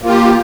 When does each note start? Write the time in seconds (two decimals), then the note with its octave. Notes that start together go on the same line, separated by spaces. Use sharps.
0.02 A#3
0.05 F4
0.08 G4